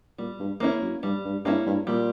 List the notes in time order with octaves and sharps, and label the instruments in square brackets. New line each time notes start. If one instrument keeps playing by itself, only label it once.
[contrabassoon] A#2 [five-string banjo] G3
[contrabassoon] G2
[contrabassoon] E2 [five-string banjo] A#3 C#4 E4
[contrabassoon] F#2
[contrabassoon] G2 [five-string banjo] G3
[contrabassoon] G2
[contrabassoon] G2 [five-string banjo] A#3 C#4 E4
[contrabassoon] G2
[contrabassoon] A#2 [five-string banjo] G3